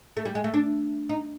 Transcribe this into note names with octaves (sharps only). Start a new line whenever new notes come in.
A3
G3
G#3
A3
D4
D#4